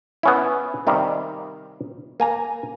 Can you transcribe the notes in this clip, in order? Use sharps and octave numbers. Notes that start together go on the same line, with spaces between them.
B3 C#4 E4
C3 D#3 G3 F5
A#3 G#5 A#5